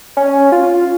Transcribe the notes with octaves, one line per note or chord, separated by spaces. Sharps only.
C#4
F4